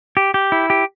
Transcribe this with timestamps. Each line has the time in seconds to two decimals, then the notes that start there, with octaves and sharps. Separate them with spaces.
0.17 G4
0.34 G4
0.52 E4
0.70 G4